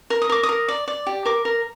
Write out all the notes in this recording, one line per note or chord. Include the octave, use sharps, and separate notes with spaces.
A#4
D#6
A#4 D6
D#6
A#4
D5
D5
G4
A#4 D6
A#4